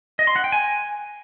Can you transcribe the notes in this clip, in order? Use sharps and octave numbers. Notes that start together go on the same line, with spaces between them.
D#5
C6
F#5
G5
G#5